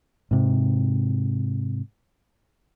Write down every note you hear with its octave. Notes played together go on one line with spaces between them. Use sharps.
G#2 C3